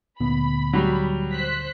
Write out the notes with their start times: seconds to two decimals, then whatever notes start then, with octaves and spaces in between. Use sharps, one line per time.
0.20 D2 A#2 B3 B5
0.73 F#3 G3
1.32 C5 F#6 B6